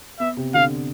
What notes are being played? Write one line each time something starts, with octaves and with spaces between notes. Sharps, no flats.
B3 E5
C3
D3 F5